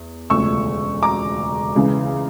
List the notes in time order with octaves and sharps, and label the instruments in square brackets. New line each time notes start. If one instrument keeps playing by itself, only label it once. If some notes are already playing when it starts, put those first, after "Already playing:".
Already playing: [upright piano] E2
E1 D2 C#3 F3 A3 C#6 E6
A#5 D6
C#2 C#3 E3